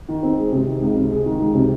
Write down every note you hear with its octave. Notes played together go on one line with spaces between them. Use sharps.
D#3
C4
G#3
C3
D#3
C#2
C3
G#3
D#3
C#2
C3